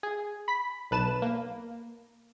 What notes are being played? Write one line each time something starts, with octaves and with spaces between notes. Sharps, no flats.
G#4
B5 B6
B1 B4 A5 E7
A#3